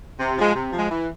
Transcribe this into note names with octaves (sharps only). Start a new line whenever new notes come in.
C3
F3 G#3
C3
F3
G#3
E3